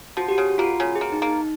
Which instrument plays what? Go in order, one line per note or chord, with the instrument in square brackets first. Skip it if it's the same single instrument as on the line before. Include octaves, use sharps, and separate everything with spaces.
[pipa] F3 [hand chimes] F#4
[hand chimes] G4
F#4
[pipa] C#3
[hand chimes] F#4
[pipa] A#3 [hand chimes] F4
[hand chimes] F#4
[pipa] C#3 [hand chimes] F#4
[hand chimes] G#4
[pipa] A#3
[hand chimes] D#4
[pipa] A#3
[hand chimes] D#4